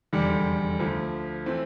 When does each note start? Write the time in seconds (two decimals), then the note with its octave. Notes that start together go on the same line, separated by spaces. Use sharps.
0.13 F1 E2 D3 G3 D4
0.79 D2 D3 F3
1.46 E3 A3 C4